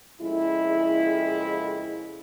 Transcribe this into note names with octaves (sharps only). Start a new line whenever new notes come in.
F2 C#3 G#3 A#3 E4